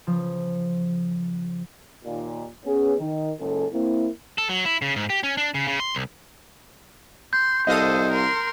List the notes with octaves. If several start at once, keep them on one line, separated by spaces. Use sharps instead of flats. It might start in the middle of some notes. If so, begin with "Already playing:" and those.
C#3 F3
D#2 A#2
B3 C#4 G#4
D#3 D#4
F#1 C#2 C#4 A4
A#3 C4 E4
A4
F#3
E4
C#3
G#2
G4
C#4
D4
C#3
C#3
C6
C2
C6 G6
C2 A4 C5 D#5 F5 D#6
A#4 C6